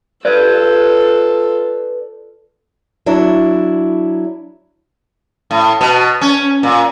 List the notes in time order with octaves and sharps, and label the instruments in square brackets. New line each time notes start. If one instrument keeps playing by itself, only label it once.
[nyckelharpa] F4 A4 [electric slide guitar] B4 D5
[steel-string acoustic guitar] F#3 D4 E4
[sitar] A2
B2
C#4
A#2